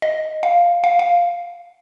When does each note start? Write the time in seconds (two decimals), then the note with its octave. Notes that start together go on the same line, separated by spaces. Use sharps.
0.02 D#5
0.43 F5
0.84 F5
0.99 F5